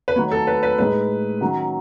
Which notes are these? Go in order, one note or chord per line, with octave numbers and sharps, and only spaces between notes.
B4
D#3 F#3 A3 C#5
A4
B4
B4
A2 G#3 D#4 B4
D#3 F#3 C#4